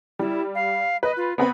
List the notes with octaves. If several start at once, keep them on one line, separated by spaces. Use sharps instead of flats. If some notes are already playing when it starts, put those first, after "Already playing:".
G3 E4
F5
B4 D#5
F4
B3 C4 B4 B5